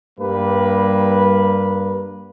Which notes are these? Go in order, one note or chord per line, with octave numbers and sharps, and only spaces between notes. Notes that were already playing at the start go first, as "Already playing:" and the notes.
G2 G3 A#3 B4